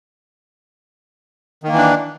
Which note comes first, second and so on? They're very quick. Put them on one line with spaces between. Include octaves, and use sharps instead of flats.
D#3 A#3 E3 D4